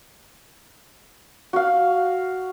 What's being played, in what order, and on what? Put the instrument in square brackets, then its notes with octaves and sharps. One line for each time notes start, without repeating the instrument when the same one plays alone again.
[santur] F#4 F5